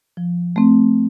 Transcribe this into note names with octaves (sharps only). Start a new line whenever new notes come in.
F3
A3 C4